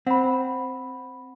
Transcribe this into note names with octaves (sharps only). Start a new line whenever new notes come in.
C4 F#5 B5